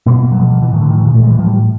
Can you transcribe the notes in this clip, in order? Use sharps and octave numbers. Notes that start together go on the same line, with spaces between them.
B2 A#3
B3
A#3
F#3
B2 F3
F3
E3
A2 D#3
D3
D#3
E3
A#2 D#3
A3
G#3
E3
A2 F3
G3